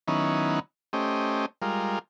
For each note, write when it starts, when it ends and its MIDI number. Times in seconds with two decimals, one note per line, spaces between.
0.08 0.60 51
0.08 0.60 54
0.08 0.60 59
0.08 0.60 61
0.08 0.60 63
0.08 0.60 64
0.93 1.46 57
0.93 1.46 61
0.93 1.46 67
0.93 1.46 72
0.93 1.46 75
1.62 1.99 55
1.62 1.99 56
1.62 1.99 65
1.62 1.99 70